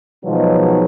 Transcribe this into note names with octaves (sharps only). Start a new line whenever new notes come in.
B2 D#3 F3 F#3 G#3 B4